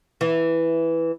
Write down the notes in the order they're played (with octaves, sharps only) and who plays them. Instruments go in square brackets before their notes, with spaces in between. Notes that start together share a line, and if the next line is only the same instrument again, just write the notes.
[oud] E3